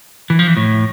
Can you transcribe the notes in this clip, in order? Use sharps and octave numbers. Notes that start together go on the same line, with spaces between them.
E3
F3
E3
A2